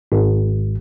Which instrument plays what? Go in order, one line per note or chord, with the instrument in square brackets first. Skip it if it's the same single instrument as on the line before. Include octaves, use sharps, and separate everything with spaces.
[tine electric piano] G#1